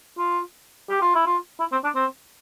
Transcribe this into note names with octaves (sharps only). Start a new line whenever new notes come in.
F4
G4
F4
E4
F4
E4
C4
D4
C4